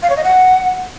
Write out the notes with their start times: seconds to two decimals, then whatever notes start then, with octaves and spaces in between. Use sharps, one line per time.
0.03 F5
0.10 C#5
0.17 D#5
0.24 F#5